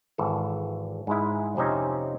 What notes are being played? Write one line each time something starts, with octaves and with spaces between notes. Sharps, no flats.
G#1 E3 A4
G#2 G#3 E4
F2 C3 C4 C#4 D#4